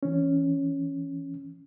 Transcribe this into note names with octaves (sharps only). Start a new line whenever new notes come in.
E3 C#4